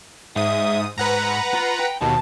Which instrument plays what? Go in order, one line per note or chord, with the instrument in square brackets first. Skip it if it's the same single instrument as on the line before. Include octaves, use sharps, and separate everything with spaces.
[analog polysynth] G#2 D#6 [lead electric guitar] E5 F#5
[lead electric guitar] G#2 [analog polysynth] B4 F#5 A#5
[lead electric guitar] F4
G5
[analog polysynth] D#2 B2 [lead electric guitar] A5